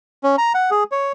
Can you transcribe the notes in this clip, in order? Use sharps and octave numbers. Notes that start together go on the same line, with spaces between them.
C#4
A#5
F#5
G#4
C#5